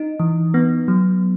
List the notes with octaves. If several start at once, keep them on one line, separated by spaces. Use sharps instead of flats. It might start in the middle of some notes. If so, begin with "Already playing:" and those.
Already playing: D#4
E3
B3
F#3